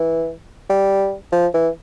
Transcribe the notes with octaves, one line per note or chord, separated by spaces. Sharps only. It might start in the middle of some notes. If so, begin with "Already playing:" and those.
Already playing: E3
G3
F3
E3